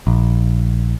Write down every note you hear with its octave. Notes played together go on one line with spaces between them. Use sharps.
A#1